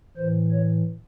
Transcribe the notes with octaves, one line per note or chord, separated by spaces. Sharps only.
A2 E3 C5
C#5